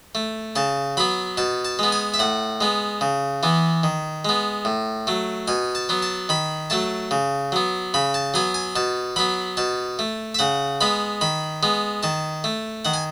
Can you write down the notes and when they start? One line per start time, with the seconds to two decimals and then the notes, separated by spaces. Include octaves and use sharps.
0.15 A3
0.56 C#3 A5
0.97 F#3 B3 B5
1.37 B2 A5
1.65 A5
1.79 G#3 B3
1.92 G#5
2.14 E5
2.19 A2 F#5
2.61 G#3 B3
3.01 C#3
3.43 E3 B3
3.83 D#3
4.25 G#3 B3
4.65 A2
5.07 F#3 A3
5.48 B2 G#5
5.75 A5
5.89 F#3 B3
6.02 A5
6.29 D#3 B5
6.70 F#3 A3 A5
7.11 C#3
7.52 F#3 B3
7.94 C#3 B5
8.14 A5
8.34 F#3 B3 G#5
8.54 G#5
8.76 B2 A5
9.16 F#3 B3 B5
9.57 B2 A5
9.99 A3
10.35 E5
10.39 C#3 F#5
10.81 G#3 B3 B5
11.21 D#3 B5
11.63 G#3 B3
12.03 D#3 A5
12.44 A3
12.85 D#3 F#5
12.93 G#5